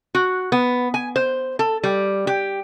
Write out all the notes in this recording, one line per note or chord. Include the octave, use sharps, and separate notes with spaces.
F#4
B3
G#5
C5
A4
G3
G4